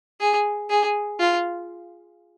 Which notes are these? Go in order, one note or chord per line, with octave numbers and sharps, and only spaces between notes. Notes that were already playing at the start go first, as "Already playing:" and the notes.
G#4
G#4
F4